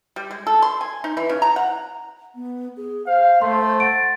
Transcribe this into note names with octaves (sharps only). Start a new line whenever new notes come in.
G3
G#3
A4
C6
G#5
D#4
E3
C#3
A#5
F#5
B3
G#4
C5 F5
A3 C6
F#5 A6 D7